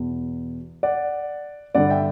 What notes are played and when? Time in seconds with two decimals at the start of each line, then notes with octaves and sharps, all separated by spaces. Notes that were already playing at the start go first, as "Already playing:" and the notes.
Already playing: E2 B2
0.83 D5 F#5
1.75 G2 D3 D5 F#5
1.90 E5 G5